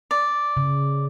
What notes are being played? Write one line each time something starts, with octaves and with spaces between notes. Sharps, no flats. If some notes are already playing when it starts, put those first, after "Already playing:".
D5
C#3